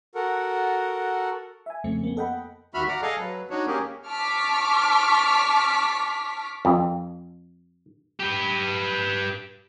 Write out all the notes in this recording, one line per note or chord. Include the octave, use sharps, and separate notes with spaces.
F#4 A4 A#4 F#5
E5 G#5
F2 C#3 A3 C4 C#7
A#3 B3
A4 D#5 F#5 G5 B5
D#2 F#4 E5 B5 F6
D5 F#5 A#5 F6
G#4 A4 D#5 F5
F#3 B4
D4 D#4 F#4 C#5
A#3 C#4 G4 G#4 A#4
A5 C#6 D6 F6 B6
F2
G4 B4